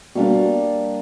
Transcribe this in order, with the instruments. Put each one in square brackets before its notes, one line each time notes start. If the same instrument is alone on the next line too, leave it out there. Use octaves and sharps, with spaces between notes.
[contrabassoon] B2 [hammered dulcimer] G3 A#3 D4
[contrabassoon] B2